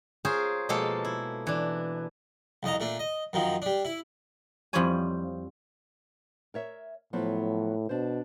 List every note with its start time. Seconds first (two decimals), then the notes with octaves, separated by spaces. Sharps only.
0.25 F4 G#4 A#4 C5 C#5
0.69 B2 F3 G#3 A#3 F4 A4
1.05 E4
1.47 E3 D4
2.63 C2 F2 D#5 A#5
2.80 A#2 A3 D4
2.99 D#5
3.33 F#2 D#3 F3
3.62 G3 D4
3.85 E4
4.73 F2 F3 G3 E4 C#5 G#5
6.54 A#4 C#5 E5
7.13 A2 F3 F#3 B3
7.89 B2 D4 C5